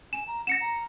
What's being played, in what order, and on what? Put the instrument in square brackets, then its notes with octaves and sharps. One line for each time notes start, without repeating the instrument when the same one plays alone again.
[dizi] G#5 [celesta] E7
[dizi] A#5
[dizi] F#5 [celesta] A#6 C#7 E7
[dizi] A#5